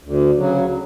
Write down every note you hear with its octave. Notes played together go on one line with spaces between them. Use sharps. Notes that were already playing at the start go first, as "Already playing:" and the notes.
D2
C#3 F#3